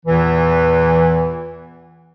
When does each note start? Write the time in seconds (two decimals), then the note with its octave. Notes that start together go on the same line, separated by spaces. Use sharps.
0.05 E2 A#2 E3